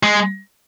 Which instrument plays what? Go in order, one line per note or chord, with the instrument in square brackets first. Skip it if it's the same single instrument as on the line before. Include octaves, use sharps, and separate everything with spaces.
[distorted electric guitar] G#3